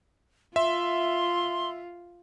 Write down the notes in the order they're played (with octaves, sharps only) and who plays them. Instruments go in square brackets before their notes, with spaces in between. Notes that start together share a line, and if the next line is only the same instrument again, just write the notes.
[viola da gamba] F4 [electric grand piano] E5 [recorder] C6